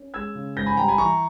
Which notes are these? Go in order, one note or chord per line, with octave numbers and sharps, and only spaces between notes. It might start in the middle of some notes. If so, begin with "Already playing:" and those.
Already playing: C#4
G#3 E6 G#6
C#3
G#2 G6 A#6
G#5 B5
G3 G5 A#5
G#5 B5
E3 A#5 C#6